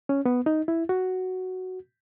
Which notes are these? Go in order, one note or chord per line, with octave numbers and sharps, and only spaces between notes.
C#4
B3
D#4
E4
F#4